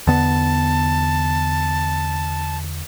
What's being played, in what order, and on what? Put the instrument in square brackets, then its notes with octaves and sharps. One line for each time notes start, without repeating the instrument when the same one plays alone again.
[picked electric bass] E2 D3 B3 [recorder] A5